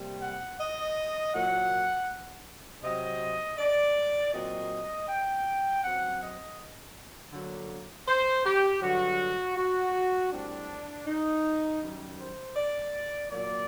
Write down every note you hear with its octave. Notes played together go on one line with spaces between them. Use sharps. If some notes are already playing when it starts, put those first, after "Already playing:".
Already playing: C3 G3 A#3
F#5
D#5
A#2 F#3 A#3 F#5
C3 F#3 C4 D#5
D5
A#2 F#3 C4 D#5
G5
F#2 F#3 C4 F#5
D#5
D3 F#3 A#3
C5
G4
G2 D3 F#3 F#4
F#4
A2 G3 C4 D4
D#4
F#2 D#3 G3
C5
D5
A#2 F#3 A#3 D5